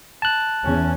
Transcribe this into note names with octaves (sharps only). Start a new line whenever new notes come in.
A5 F#6
E2 C#4